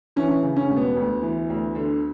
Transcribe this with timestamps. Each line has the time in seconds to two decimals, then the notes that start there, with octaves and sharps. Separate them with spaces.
0.16 E3 C#4
0.43 C#3
0.56 C#4
0.70 E1
0.77 B3
0.96 D2
1.22 E3
1.50 D2
1.75 D3